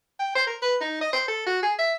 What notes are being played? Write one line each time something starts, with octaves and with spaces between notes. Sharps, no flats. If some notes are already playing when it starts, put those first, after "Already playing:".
G5
C5
A#4
B4
D#4
D#5
C5
A4
F#4
G#4
E5